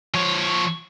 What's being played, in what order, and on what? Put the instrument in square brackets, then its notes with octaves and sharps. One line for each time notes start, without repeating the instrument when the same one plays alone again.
[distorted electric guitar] F3 C#5